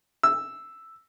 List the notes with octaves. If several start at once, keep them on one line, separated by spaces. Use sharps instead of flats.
E6